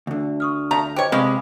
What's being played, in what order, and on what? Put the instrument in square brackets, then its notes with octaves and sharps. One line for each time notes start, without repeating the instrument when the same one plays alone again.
[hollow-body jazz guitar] D2 D3
[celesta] C#6 D#6 F6
[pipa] A3 [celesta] F5 [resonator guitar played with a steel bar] A#5
[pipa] G4 C#5 [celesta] C5 D#5
[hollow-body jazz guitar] C3 [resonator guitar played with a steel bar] G#3 [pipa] C#4 F5 [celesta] B5 D6